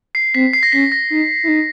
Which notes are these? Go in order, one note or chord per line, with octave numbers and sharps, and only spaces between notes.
C7
C4 B6
C7
A#6
C#4 B6
A#6
D#4
E4
D#4